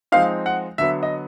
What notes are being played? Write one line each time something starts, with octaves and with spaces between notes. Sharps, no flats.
F3 G#3 C4 D#4 F5
F#5
D3 F#3 B3 E5
D#5